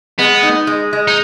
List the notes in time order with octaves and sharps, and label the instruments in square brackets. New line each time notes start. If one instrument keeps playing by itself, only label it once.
[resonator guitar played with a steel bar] G#3 [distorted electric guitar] B3
[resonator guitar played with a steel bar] D#4
G#3
G#3
[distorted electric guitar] D#4